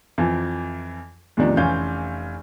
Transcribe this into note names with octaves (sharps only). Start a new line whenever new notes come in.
F2 E3 F3
E2 A2 C3 D#3 F3 D4
F1 E3 C#4 F5 G6